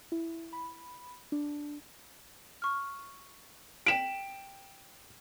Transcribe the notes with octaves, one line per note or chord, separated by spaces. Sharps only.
E4
B5
D4
C#6 F6
G5 B6 D7 E7 F#7